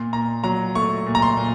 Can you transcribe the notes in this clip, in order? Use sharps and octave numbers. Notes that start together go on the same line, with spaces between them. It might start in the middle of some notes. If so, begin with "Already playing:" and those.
Already playing: A#2 C6
A#2 A#5
F#3 A#5
A3 C#6
A#2
A#5
C6
A#2